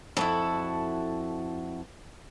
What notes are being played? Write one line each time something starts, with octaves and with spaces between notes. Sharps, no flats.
F2 E4 F#4 A4